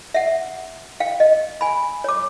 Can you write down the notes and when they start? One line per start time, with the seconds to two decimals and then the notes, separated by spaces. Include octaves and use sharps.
0.14 E5 F#5
1.00 F5 G5
1.20 D#5
1.61 G#5 B5
2.04 C#5 D6